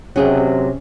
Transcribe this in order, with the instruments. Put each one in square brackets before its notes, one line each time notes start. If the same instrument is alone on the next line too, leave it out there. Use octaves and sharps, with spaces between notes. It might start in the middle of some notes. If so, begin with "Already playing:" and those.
[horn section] C3 [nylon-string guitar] F#3 G#4 D#5 [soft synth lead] C#4